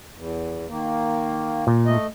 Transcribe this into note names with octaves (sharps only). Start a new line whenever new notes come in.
E2
D#3 A#3
A#2
A3 D#5